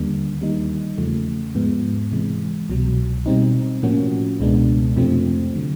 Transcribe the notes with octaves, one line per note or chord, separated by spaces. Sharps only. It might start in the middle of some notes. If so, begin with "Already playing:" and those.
Already playing: D#2 D3 G3 A#3 D4
D#3 G3 A#3 D#4
E2 C#3 F3 A3
G#2 F3 G#3 B3
C3 E3 G#3
C2 B2 F#3
B2 G3 C4 D#4
A2 F3 A#3 C#4 F#4
C#2 B2 G#3 B3 D4
F2 C3 F3 A3 C4
D3 F#3